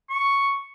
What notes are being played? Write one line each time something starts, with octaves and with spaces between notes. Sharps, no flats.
C#6